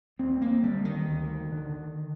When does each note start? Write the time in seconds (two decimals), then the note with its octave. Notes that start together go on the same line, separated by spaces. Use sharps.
0.19 D2 C4
0.42 A#3
0.63 D3 G3
0.85 D#3
1.08 D2
1.52 D3